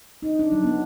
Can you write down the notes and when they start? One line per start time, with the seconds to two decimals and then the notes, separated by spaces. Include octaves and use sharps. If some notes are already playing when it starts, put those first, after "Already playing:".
0.22 D#4
0.39 D4
0.52 F#3
0.64 B3